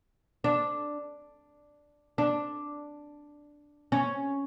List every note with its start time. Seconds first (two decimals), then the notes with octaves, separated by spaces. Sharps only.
0.44 D4
2.18 D4
3.92 C#4